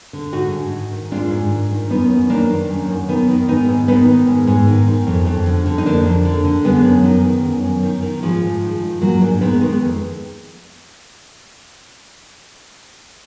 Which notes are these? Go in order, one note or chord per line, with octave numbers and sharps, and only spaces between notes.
D3
G#2 D#4 F#4
G#2
D#3
D#3
G#2 D4 F4
G#2
D#3
D#3
F#2 B3 D#4
F#2
D#3 A#3 D4
D#3
F#2
F#2
D#3 B3 D#4
D#3
G#2 B3 D#4
G#2
D#3 B3 D#4
D#3
G#2
G#2
D#3
D#3
F2
F2
D3
D3
D#4
F2 A#3 D4
F2
D3
D3
F#2 G#3 B3
F#2
D#3
D#3
F#2
F#2
D#3
D#3
G#2 F3 G#3
G#2
D#3
D#3
G#2 F#3 A#3
G#2 A#3 D4
D#3 G#3 B3
D#3 G#3 B3
F2